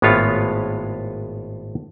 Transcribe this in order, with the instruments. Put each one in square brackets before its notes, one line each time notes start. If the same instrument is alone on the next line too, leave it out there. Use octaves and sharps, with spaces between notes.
[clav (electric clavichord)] G#1 A2 G#3 B3 F4 C#5